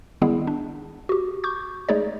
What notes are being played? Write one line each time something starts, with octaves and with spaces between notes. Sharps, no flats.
D#3 G3 G#3 B3 E4 G#4
D4
F#4 G4
C#6 D6 G6
G#3 A3 D#4 G#4 C#5 D5